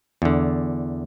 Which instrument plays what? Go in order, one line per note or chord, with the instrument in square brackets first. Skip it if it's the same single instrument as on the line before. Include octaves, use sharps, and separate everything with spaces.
[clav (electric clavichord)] E2 D3